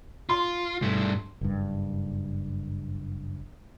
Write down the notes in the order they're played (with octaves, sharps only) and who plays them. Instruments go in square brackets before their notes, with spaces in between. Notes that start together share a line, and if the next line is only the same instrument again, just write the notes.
[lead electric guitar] F4 [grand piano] C6
[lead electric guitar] G2 A3
[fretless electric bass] F#1 G2